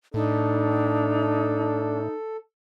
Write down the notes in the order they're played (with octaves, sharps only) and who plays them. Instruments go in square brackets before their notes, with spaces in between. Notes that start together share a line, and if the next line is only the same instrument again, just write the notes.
[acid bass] A2 [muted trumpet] D4 [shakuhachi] D#4 [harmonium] A4